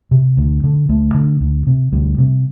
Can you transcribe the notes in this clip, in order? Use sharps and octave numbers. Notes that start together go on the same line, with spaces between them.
C3
D2
D3
D2 A3
D3
D2
C3
D2 G3
C3